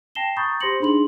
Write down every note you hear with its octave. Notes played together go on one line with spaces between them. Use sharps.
G5 A5 A#6 C7 E7 G7
A#5 B5 C#6 D#6 G6 A6
G4 C5 C6 A#6 C#7 F#7
D4 D#4 G#4 B5 C6 F#7